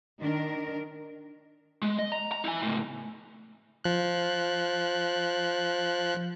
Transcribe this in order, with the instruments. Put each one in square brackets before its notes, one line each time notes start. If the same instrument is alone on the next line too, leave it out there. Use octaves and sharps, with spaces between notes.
[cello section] D#3 D4 A#4
[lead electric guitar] G#3
D#5
A#5
A#5
E4 G#5
C#2 A2
[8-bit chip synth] F3 F#6